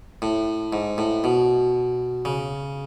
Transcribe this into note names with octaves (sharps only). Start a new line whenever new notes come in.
A2
G#2
A2
B2
C#3